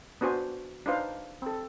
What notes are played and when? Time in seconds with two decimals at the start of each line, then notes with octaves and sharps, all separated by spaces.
0.21 B3 D4 F#4 C5 G#5
0.86 D4 D#4 F4 B4 C5 F5
1.42 C4 A4